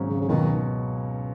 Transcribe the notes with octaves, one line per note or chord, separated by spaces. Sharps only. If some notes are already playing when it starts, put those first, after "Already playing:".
Already playing: G#1 G#2 F#3 C#4
C#3
C#3
C#2 B2 D#3 F#3